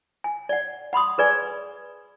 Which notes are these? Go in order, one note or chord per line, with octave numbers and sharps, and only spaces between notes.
G#5
D5 F#5
F#5 B5 C6 D#6
G#4 B4 D5 G#5